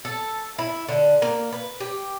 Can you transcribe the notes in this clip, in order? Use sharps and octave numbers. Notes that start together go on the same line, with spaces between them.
A4
E4
D3
A#3
B4
G4